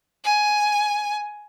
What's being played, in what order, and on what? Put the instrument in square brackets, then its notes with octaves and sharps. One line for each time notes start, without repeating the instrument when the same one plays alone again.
[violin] G#5